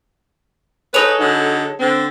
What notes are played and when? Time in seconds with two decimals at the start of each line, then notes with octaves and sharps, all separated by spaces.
0.94 D#4 G#4 A4 B4 C#5
1.20 D3 F#3 D#4
1.79 D3 C4